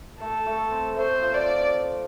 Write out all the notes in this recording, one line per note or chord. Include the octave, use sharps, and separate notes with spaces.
A3 A4
A3
C4
A3 C5
F3
D5
F3